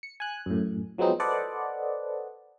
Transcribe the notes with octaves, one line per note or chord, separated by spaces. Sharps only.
C#7
G#5 F#6
F#2 A2
F3 F#3 G#3 B3 C4 D#4
A4 B4 C5 D5 D#5 F#5